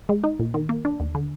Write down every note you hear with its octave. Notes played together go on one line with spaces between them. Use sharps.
G#3
D#4
A#2
D#3
A#3
D4
D#2
D3